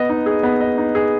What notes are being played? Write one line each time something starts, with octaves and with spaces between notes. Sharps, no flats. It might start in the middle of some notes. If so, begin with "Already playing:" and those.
Already playing: B3 D#5
D#4
G#4
B3
D#5
D#4
G#4